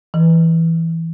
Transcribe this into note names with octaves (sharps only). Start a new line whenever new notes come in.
E3